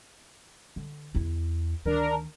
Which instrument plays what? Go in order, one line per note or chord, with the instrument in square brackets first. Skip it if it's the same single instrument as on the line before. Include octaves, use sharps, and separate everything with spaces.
[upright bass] D3
E2 E4
[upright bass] D2 D#3 [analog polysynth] D4 A#4